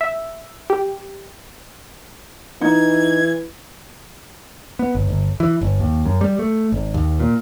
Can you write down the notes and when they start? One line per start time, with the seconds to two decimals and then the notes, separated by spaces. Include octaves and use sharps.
0.01 E5
0.70 G4
2.61 E3 D#4 G#6
4.79 B3
4.95 G1
5.09 G1
5.40 E3
5.61 G1
5.80 D#2
6.06 F#2
6.21 G3
6.39 A3
6.72 G#1
6.94 D#2
7.20 A#2